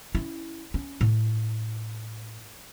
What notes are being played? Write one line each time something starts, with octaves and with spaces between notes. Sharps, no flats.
C#4 E4
C#4
A2